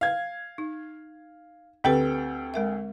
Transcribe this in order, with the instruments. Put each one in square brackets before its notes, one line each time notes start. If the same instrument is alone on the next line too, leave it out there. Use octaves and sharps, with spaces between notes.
[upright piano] F5 G#6
[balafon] D#4
[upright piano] D2 A4 G5 [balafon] C4 G4 B4
[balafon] G#3 A#4 E5